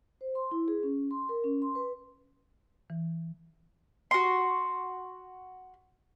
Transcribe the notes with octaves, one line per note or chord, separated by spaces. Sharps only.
C5
C6
E4
G#4
C#4
C6
A#4
C#4
C6
B4
E3
F#4 C6